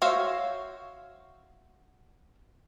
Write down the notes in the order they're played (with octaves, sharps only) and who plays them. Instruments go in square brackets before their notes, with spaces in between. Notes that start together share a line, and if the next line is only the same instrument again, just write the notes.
[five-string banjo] F#4 C5 C#5 E5 F5